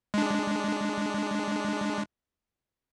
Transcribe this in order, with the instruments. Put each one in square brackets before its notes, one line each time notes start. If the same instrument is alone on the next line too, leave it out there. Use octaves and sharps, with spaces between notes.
[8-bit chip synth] G#3 D4